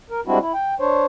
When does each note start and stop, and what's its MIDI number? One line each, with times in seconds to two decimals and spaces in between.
0.10 0.21 70
0.27 0.38 55
0.27 0.38 56
0.27 0.38 60
0.27 0.38 62
0.27 0.38 64
0.27 0.38 66
0.41 0.52 64
0.54 0.75 79
0.80 1.06 62
0.80 1.06 72
0.80 1.06 73